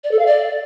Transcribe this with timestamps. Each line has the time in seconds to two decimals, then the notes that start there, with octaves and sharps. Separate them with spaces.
0.04 D5
0.11 A4
0.19 F5
0.26 D5